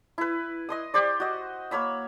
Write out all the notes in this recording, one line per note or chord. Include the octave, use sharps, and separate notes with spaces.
E4 B4
D#5 C6 D#6
G4 C5 D5
F#4 D#5
A#3 C#5 B5 E6